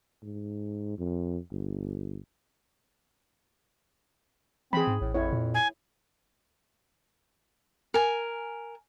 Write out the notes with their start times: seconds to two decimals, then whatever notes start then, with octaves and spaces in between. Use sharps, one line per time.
0.22 G#2
0.98 F2
1.51 G1
4.73 E3 C4 G#4 B5
4.87 G#2
5.01 A1 A2
5.14 F2 E4 C#5
5.32 A#2
5.54 G#5
7.94 A#4 G#5